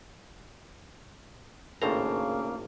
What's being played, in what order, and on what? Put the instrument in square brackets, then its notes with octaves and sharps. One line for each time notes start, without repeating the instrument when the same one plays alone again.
[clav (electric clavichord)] G#1 A2 A#5 [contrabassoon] C#3 [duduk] A#3 [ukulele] D4 A4 C5